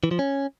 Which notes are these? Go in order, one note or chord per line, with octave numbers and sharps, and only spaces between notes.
E3
F3
C#4